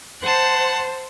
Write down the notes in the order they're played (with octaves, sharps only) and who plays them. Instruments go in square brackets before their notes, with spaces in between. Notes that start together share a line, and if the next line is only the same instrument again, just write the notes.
[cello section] C5 [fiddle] F#5 A5